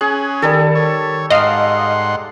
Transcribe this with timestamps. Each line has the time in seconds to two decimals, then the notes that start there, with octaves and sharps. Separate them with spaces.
0.01 C#4 G#4 F#6
0.42 D#3 G3 A4 A#4
0.75 C#5
1.30 G#2 D#5 F5 F#5 C6 D6 E6 C7